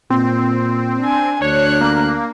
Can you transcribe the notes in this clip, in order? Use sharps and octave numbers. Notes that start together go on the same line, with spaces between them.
A#2 C4
D4 G#5
D2 D4 C#5 F#6
A#3